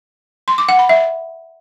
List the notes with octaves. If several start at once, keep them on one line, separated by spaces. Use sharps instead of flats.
C6
D6
F#5
B5
E5